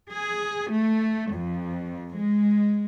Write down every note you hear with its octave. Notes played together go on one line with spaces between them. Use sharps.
G#4
A3
F2
G#3